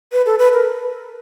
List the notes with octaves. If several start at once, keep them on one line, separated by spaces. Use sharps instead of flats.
B4
A4
B4
A#4